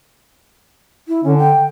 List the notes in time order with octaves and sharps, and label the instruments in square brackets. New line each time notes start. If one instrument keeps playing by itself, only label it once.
[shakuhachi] E4
[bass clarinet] D3 [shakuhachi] C#4
[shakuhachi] G5